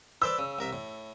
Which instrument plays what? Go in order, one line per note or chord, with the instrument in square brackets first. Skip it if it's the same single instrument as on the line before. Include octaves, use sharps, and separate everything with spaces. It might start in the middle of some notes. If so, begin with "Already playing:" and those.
[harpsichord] B4 C5 D5 [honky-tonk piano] E6
[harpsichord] C#3
C2 A#4 E5
A2